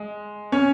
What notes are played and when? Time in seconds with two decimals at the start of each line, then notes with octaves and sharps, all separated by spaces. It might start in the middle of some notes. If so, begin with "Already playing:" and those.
Already playing: G#3
0.52 C#4 C#5